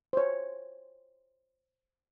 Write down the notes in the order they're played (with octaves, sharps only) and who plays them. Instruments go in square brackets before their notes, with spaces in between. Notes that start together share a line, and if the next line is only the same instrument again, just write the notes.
[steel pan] C5 C#5